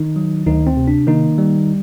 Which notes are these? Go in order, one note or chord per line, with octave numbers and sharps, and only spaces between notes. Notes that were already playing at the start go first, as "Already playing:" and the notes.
Already playing: D#3 D#4
F#3
D2 D#3 D#4
C4
C3
D4
D#3 A#3 D#4
G3